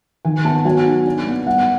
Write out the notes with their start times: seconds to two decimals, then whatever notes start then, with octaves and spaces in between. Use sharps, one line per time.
0.25 D#3 G#5
0.45 B3 A5
0.65 F#3 G#5
0.86 D#4
1.06 D4
1.26 B3
1.47 G3 F#5